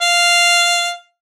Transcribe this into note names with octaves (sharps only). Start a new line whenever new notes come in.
F5